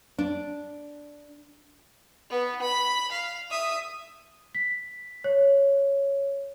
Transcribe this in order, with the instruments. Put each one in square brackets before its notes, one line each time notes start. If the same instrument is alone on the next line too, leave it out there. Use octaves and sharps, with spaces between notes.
[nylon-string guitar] D4
[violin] B3
B5
F5
E5 D#6
[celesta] B6
C#5